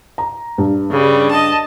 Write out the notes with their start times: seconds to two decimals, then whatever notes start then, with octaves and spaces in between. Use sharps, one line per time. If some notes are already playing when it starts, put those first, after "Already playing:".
0.18 A#5
0.58 G2
0.91 C#3 G3
1.31 D#5 A5